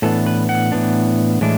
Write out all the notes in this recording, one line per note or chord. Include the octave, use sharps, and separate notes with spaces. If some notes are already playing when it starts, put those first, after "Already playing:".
A2 E3 B3 D4 A4
B4
F#5
A2 E3 B3 D4
A2 E3 G#3 D4